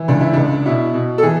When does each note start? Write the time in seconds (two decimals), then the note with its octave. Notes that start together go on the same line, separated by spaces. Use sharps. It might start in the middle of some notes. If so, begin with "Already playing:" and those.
Already playing: E3
0.08 C#2 D4
0.21 E4
0.33 C#2 D4
0.66 B2 E4
0.94 B2
1.18 A4
1.23 E3 G#4